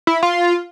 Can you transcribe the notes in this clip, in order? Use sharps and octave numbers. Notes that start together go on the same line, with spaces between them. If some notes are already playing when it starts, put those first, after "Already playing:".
E4
F4